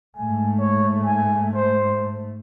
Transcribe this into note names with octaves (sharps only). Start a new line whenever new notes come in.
G#2 A3 G#5
C#5
G#5
C5